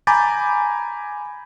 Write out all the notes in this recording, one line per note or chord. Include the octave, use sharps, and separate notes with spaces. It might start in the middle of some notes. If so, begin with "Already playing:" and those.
G#5 A#5 B5 D6 G6 A6